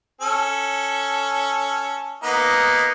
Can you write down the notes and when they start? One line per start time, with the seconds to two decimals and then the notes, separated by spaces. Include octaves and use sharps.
0.21 C#4 A4
2.23 A#3 B3 D#4